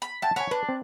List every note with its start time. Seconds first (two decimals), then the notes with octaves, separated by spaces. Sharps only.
0.02 B5
0.22 E5 F#5 G5 A5
0.36 C#5 F#5 G#5 B5
0.51 D4 B4
0.69 C4